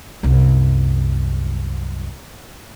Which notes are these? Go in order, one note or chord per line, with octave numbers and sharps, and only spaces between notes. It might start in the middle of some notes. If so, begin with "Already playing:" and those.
C2 F#2